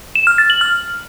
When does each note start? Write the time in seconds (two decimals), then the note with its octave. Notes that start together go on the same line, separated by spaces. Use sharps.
0.15 E7
0.27 F6
0.38 A6
0.50 F#7
0.61 F6